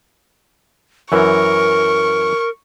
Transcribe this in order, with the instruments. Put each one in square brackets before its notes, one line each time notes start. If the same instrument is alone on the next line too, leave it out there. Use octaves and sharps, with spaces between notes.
[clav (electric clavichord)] F#2 E3 [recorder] A#4 [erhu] C#6